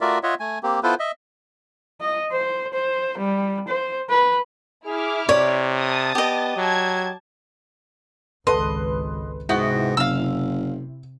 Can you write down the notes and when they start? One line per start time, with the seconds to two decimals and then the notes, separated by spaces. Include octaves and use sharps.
0.01 A3 F4 F#4 A#4 D5 E5
0.23 F4 C#5 D#5 E5 F#5
0.40 A3 G#5
0.63 A#3 C4 G4
0.83 B3 E4 F4 A4 B4 C5
0.99 D#5 E5
2.01 D#5
2.33 C5
2.74 C5
3.18 G3
3.68 C5
4.09 B4
4.86 E4 G#4 D6 F6
5.29 C3 C#5 D5
5.77 A5 D#6 A6
6.15 B3 G4 D#5
6.56 F#3 A5 G#6
8.47 G#1 C#2 A4 B4 D#5 C6
9.49 G#2 C3 B3 E4 F#4 G5
9.97 F#1 F5 E6